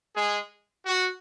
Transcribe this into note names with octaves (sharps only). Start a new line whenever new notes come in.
G#3 G#4
F#4